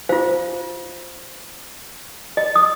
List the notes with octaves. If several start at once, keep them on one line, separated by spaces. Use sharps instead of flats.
F4 C5 F5
D#5
D#6